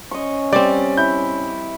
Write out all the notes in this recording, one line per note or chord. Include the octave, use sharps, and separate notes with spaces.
C#4 D#5 C#6
G3 C4 D5 D6
E4 G6